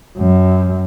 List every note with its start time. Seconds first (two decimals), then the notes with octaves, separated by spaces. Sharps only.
0.17 F#2